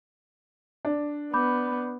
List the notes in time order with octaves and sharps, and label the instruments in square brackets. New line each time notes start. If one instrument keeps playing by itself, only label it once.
[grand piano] D4
[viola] B3 [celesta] B5 D6 G6